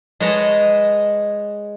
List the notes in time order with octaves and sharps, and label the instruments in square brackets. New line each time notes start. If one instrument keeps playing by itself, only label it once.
[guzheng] G#3 B4 C#5 D#5 G#5 A5